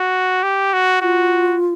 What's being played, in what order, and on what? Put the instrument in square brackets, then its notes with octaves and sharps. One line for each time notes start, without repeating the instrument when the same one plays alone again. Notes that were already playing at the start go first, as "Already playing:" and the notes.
Already playing: [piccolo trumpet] F#4
G4
F#4
[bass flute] F4 [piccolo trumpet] F#4